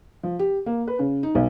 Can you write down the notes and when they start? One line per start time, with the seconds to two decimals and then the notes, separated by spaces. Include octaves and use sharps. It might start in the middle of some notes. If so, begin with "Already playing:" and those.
0.23 F3
0.39 G4
0.66 A#3
0.87 B4
0.99 C#3
1.23 D#4
1.35 B1